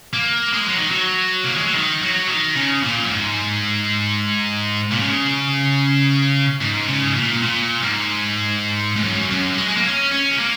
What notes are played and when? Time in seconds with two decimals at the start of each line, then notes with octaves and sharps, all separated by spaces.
0.13 A#3
0.53 G#3
0.66 F#3
0.78 D#3
0.91 F#3
1.44 A#3
1.54 G#3
1.65 F#3
1.75 D#3
2.03 F#3
2.29 D#3
2.56 C#3
2.83 A#2
3.03 F#2
3.10 G#2
4.91 A#2
4.99 C#3
6.61 G#2
6.88 C#3
7.07 G#2
7.16 A#2
7.43 A#2
7.83 G#2
8.96 G#2
9.04 F#2
9.31 F#2
9.57 G#3
9.69 G#3
9.77 A#3
9.85 C#4
10.12 C#4
10.31 G#3
10.39 A#3